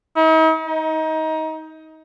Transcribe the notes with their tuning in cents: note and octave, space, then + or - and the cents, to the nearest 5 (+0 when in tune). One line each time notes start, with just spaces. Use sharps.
D#4 +45
D#4 +25